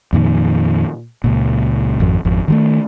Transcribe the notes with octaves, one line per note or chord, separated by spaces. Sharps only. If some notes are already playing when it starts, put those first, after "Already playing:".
F2 A#2 D#3
C#2 A#2
G#1 F2
G#1 F2
D#3 F#3 A3